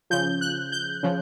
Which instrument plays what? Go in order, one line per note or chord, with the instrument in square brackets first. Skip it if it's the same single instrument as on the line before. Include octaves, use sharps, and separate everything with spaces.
[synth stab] C#3 F3 G6
F#6
G6
C#3 F3